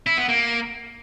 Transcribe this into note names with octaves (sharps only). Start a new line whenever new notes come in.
E4
B3
A#3